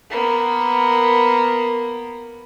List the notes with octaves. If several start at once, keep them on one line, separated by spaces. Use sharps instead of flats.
A#3 B3